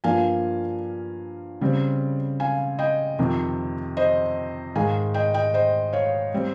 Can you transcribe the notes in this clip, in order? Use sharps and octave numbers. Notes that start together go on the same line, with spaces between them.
G2 F3 A#3 F5 G#5
C#3 G3 C4
F5 G#5
D#5 G5
F2 C3 D#3
C5 D#5
G#2 D#3 G#3 F5 G#5
D#5 G5
D#5 G5
C5 D#5
C#5 F5
G3 C4